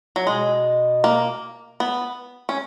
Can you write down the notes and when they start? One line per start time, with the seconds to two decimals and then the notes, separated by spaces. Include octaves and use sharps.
0.16 F#3
0.26 B2 G#3
1.04 A#3
1.80 B3
2.49 C#4